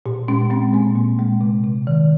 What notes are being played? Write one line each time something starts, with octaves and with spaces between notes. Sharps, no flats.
A#2 G4
G#3 C#4
G#3 C4
A#2 A#3
A#2
G#3
C3
C3
D#3